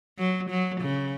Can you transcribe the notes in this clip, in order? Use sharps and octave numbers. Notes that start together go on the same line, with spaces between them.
F#3
F#3
C#3